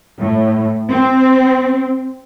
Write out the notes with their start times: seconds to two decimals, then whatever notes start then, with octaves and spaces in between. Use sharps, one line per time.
0.20 A2
0.90 C4